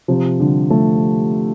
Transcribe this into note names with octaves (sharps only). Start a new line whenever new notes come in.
C3 F3
D3 G3
F3 A3